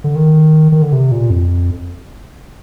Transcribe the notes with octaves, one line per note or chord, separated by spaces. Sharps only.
D3
D#3
D#3
D3
C3
A#2
F2